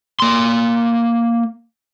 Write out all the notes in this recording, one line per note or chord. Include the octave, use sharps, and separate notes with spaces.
A#3 C6